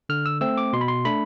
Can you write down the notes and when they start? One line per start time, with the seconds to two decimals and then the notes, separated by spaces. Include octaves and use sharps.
0.09 D3 F6
0.26 E6
0.41 A3 C4 E6
0.58 D6
0.73 B2 C6
0.81 B5
0.88 C6
1.05 A3 D4 B5